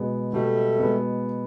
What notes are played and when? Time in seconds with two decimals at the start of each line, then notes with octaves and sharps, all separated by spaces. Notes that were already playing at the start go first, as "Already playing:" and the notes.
Already playing: B2 G#3 B3
0.33 B2 G3 A3
0.79 G#3 B3